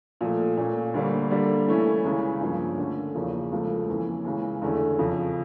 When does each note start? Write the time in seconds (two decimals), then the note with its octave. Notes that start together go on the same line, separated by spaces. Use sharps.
0.21 A#2 F3 A3
0.57 A#2 A3 C#4
0.94 D2 D3 G3 A#3
1.30 D3 G3 A#3
1.67 E3 A3 C#4 E4
2.04 C#2 C#3 E3
2.41 G2 F3 A#3 C#4
2.78 D3 A3 C#4
3.15 E2 C#3 F3 A#3
3.52 C#2 C#3 F3 A3
3.88 F2 E3 A#3 C#4
4.25 C#2 C#3 E3
4.62 E2 D3 A3 C#4 E4
4.99 F2 C#3 F3